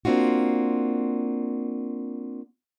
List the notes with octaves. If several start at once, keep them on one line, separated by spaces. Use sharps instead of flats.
A#3 C4 D4 F4 F#4